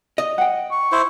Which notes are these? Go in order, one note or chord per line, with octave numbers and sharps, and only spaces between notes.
D#5
F#5 G5
C#6
E4 C5